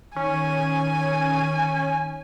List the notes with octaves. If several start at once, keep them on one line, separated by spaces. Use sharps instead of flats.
D#3 C#4 G#5